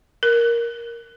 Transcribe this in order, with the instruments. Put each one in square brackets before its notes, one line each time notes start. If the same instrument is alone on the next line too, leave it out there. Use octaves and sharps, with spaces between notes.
[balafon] A#4